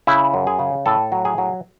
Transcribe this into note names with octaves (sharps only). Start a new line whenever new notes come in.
C#3 E4
F#2
G#4
C#3
A2 A4
F#3
G#4
F#3